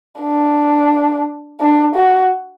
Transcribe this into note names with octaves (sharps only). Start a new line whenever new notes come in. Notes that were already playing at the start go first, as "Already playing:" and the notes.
D4
D4
F#4